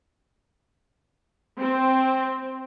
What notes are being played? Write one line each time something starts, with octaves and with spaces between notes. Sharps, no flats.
C4